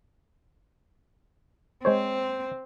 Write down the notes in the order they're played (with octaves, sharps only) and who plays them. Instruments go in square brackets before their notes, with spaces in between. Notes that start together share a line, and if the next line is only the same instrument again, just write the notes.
[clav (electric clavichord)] G#3 C5 C#5 [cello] C4